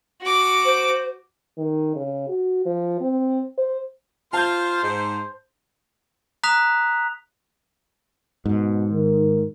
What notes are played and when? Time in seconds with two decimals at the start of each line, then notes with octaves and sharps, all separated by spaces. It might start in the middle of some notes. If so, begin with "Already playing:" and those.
0.22 F#4 D6
0.65 C5
1.58 D#3
1.96 C#3
2.29 F#4
2.66 F3
3.01 C4
3.58 C5
4.33 F4 C5 A5 G6
4.83 G#2
6.43 A#5 D#6 F#6 B6 F7
8.46 G#2 B2
8.93 D#3 A#4